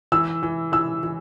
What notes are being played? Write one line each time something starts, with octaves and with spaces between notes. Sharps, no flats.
E3 E6
E3
E3 E6
E3